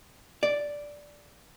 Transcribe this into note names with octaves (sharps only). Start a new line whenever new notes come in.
D5